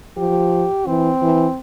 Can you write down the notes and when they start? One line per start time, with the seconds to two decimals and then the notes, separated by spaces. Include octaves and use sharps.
0.17 F3 G4
0.87 E3 C4
1.22 E3